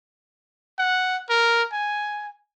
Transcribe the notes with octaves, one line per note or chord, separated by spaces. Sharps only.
F#5
A#4
G#5